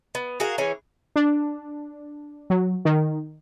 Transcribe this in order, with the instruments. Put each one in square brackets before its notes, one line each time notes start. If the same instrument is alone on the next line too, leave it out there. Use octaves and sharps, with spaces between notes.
[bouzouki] B3
F#4 G#4 A#4 F5
E3 C#4 G#4
[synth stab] D4
F#3
D#3